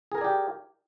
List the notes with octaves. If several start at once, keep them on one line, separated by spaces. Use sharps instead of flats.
G4 G#4 A#4 D5 G#5